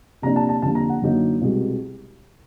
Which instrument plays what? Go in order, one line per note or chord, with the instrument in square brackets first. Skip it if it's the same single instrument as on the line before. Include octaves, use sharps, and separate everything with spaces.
[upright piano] C3 F3 A#3 D4 A#5
A5
A5
F2 D3 G3 A#3 A5
A#5
F#5
F#2 D3 F#3 A#3 D#4
C2 B2 G#3